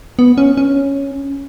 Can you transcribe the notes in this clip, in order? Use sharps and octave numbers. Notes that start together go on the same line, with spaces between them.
B3
C#4
C#4